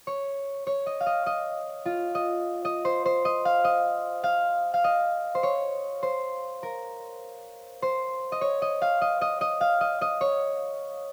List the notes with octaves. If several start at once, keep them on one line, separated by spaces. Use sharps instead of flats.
C#5
C#5
D#5
F5
D#5
D#5
F4
D#5
D#5
C5
C5
D#5
F5
D#5
F5
F5
D#5
C5
C#5
C5
A#4
C5
D#5
C#5
D#5
F5
D#5
D#5
D#5
F5
D#5
D#5
C#5